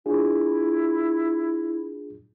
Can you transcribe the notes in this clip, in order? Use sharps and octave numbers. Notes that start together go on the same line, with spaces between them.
D4 E4 F4 G#4